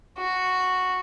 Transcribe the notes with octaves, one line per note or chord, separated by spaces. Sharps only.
F#4